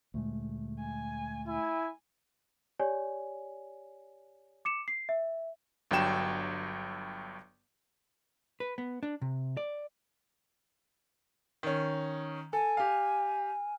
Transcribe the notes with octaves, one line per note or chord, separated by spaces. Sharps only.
D2 A#2 G#3 A3
G#5
E4 G#5
G4 C#5 D5 G#5
D6 C#7 E7
C7
E5
G1 G2 F#3 G5 E7
B4
B3
D4
C3
D5
D#3 C#4
A4 G#5
G4 F5